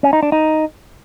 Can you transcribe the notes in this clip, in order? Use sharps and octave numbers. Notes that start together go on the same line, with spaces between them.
C#4
D#4
D4
D#4